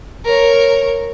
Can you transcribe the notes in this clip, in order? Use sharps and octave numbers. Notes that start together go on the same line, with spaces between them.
A#4 C#5